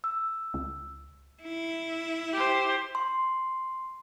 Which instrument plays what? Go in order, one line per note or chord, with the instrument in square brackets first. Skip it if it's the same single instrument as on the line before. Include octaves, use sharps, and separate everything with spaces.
[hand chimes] E6
[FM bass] C#2
[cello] E4
[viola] G4 C5
[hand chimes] C6